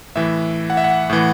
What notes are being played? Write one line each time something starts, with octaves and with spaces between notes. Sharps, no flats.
A2 E3 E5
F#5
E5
F#5
A2 E3